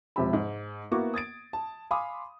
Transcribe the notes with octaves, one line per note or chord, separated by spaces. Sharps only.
E1 C3 F3 G4 E5 B5
G#2
A#3 B3 E4 F#4 C#6 D6
D#6 G#6 A6 D7
A5
F5 G#5 B5 C6 D6 D#6